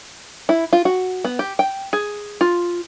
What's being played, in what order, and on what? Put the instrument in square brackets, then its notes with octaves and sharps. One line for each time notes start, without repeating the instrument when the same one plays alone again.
[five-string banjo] E4
F4
F#4
B3
G4
G5
G#4
F4